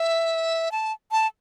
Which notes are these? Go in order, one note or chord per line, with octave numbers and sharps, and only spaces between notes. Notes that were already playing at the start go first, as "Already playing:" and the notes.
Already playing: E5
A5
A5